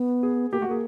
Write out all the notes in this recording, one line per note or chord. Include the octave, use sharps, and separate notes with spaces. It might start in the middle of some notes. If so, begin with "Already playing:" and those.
Already playing: B3
G#4
A#3 G4
A3 F#4
A#3 G#4